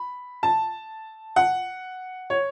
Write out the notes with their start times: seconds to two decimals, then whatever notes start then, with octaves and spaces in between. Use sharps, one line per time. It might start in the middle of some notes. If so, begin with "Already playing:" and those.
Already playing: B5
0.43 A5
1.36 F#5
2.30 C#5